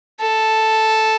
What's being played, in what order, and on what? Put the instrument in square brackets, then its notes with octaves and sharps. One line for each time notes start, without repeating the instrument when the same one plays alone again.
[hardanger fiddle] A4